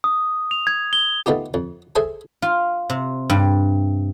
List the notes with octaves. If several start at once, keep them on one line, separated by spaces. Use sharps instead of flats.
D#6
F7
G#6
G7
A3 B3 D#4 F4 G4
F2
G#4 A4 C5 E5 G#5
F4
C3
G2